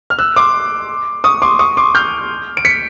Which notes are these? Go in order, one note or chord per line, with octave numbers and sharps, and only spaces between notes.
F6
E6 F#6
C6 D6
C#6 D#6
C6 D6
C#6 D#6
C6 D6
F6 G6
D7
B6 C#7